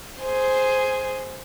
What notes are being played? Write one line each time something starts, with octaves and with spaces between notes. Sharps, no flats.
G#4 C5